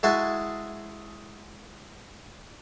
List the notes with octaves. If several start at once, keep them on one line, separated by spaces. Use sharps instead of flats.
G#3 E4 F#4 G#4 G#5 A5